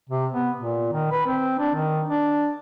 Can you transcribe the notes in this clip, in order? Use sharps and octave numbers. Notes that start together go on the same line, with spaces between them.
C3
B3
A#2
D#3
B4
C4
D4
D#3
D4